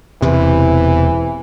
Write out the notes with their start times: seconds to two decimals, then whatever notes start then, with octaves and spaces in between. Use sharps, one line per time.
0.22 E1 E2 C3 E3